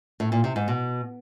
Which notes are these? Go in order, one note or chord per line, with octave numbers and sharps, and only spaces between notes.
A2
A#2
C3
G#2
B2